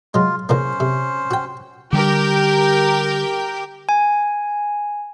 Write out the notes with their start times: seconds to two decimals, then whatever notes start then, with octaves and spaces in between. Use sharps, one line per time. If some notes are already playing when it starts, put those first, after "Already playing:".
0.14 F#3 G#3 F4
0.49 E2 C#3 A#3 C#4 C5
0.80 C3
1.31 F#4 G5
1.93 D3 G3 G4 A#4 G5
3.89 G#5